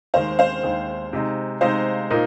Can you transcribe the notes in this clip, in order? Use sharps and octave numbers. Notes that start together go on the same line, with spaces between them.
D#2 D#3 G#3 C5 F5
C5 F5
D#2 D#3 G#3
C3 G#3 D#4
C3 G#3 D#4 C5 F5
A#2 A#3 D#4